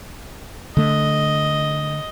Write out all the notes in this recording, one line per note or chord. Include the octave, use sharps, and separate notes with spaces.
D3 A3 D#5